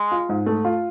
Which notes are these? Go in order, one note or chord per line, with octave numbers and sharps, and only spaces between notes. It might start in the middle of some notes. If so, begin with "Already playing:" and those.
Already playing: G#3
F4
G#2
A3
F4